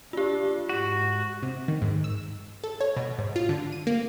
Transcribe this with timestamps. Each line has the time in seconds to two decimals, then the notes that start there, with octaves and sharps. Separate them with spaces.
0.13 D4 F4 G4
0.69 G#2 F#4
1.43 C3
1.68 D#3
1.82 G#2
2.04 E6
2.64 A4
2.81 C#5
2.96 B2
3.19 G#2
3.36 F4
3.49 D3
3.72 D#7
3.87 A#3